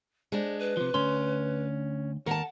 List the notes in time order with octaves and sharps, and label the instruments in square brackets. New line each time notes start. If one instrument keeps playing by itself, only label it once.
[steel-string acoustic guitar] G#3 D4 [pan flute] C5
[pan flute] B4
[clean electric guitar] C3 F3
[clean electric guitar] D2 C6 [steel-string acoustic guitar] C#4
[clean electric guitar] D#2 [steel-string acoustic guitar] A#4 A5 [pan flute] F#5